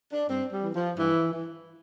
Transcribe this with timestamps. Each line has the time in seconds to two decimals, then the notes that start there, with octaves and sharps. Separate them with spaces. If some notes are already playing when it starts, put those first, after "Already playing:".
0.12 D4
0.28 G2 C4
0.52 G3
0.63 E3
0.74 F3
0.97 G2 E3
1.32 E3